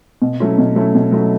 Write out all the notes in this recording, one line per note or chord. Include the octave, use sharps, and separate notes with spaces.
B2
F#3 A3 C#4 E4
B2
F#3 A3 C#4 E4
B2
F#3 A3 C#4 E4